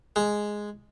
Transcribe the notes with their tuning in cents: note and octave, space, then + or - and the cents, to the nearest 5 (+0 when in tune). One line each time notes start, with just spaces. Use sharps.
G#3 +0